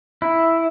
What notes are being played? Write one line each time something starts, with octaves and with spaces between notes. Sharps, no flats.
E4